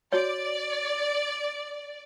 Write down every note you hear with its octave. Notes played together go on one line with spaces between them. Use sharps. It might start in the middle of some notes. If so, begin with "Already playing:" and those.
F#4 C#5 D5